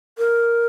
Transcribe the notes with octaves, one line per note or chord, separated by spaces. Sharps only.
A#4